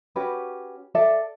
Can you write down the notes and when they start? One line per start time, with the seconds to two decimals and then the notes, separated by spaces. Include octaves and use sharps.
0.16 C#4 F#4 G4 B4
0.95 A4 D5 E5